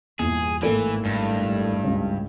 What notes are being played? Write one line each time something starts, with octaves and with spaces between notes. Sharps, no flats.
E2 G2 A#2 G#4 E7
G#1 A2 E3 A#3 A4 D7
G2
C#2 C#3